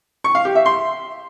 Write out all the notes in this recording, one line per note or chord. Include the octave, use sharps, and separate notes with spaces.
C#6
F5
G4
E5
C6